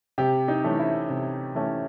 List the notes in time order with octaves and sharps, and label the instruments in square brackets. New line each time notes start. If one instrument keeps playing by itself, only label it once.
[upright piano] C3 G4
D#4
E3 A3 C#4
E4
C3
E3 A3 C#4